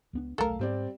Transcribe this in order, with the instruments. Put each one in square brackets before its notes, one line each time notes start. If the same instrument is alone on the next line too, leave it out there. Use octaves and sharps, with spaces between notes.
[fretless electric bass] C#2 B3 D4
[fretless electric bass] D#1 B1 A3 [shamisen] A4 A#4 [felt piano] F5
[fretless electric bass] G#2 [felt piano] G3 C4 D5